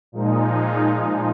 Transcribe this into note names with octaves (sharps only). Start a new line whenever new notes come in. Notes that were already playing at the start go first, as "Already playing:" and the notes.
A#2 F3 G#3 D#4